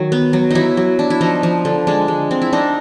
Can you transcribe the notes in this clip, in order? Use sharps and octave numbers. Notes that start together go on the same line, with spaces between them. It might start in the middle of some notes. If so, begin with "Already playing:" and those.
Already playing: D#3 F#3 D#4
B3
F#3
F#3 D#4 E4
F#3
D4
E4
F3 D#4
F3
D3
G#3 D4
G#3
C4
E4
D4 D#4